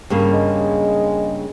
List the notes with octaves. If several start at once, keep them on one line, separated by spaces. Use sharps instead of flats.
G2 C#3 A#3
G#3